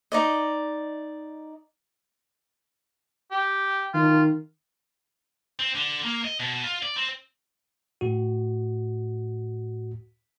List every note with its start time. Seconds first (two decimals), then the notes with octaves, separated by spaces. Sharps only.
0.12 D#4 D5 D#5
3.32 G4
3.94 D#3 F4
5.59 C4
5.75 D3
6.04 A#3
6.24 D#5
6.40 B2
6.64 F4
6.83 D5
6.97 C4
8.01 A2 F#4